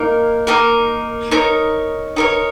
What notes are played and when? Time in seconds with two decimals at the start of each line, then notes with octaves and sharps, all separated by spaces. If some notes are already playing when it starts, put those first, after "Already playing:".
Already playing: A#3 D#4 A#4
0.47 A#3 D#4 A#4
1.31 D#4 A#4 C#5
2.16 D#4 A#4 C#5